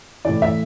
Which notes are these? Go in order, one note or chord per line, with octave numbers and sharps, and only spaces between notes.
A2 E3 D5
E5